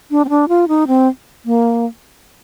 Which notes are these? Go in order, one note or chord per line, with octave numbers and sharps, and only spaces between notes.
D4
C4
D4
F4
D#4
C4
A#3